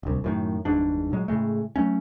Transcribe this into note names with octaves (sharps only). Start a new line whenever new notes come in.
D1 C2
F#2 A2 D#3
G1 E2 G#2 D4
A#2 F#3 G#3
A2 C#3 G#3 A3
F#3 A3 C#4